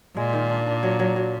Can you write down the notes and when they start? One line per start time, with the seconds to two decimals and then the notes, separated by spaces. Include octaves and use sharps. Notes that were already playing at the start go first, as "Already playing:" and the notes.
0.17 A#2 G#3
0.33 D#3
0.50 D4
0.66 D4
0.83 F#3
0.99 F#3
1.16 F#3